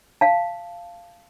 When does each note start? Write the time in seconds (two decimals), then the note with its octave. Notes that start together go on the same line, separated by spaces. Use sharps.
0.21 F5 A5